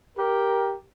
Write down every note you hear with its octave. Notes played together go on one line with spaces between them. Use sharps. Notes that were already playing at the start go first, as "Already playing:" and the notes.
G4 A#4